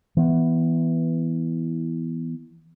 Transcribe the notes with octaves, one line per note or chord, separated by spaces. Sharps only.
E3 B3